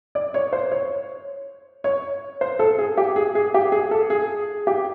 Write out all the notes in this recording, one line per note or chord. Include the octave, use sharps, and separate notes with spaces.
D5
C#5
C5
C#5
C#5
C5
A4
G#4
G4
G#4
G#4
G4
G#4
A4
G#4
G4